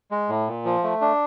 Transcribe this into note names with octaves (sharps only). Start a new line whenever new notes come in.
G#3
A2
A#2
F3
A3
D4